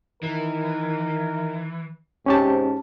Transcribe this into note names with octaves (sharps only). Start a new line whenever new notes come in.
D#3 E3 A#4
G#2 C3 C#4 G4 A5